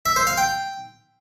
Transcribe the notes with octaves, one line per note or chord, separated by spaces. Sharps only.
E5
C5
F5
G5